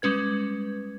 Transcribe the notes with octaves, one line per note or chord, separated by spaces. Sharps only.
G3 G#3 C#4 B4 G#6